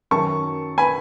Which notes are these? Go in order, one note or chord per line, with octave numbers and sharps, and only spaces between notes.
F#2 D#3 F#3 A5 C#6
G#5 B5